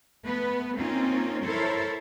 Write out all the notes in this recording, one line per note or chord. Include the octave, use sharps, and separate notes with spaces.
A3 B3 B4
A#3 C4 C#4 D#4 F4
E4 A4 A#4 C5 C#5